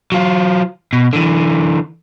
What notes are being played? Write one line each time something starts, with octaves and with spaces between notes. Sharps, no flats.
F#3 F4
B2
D3 E3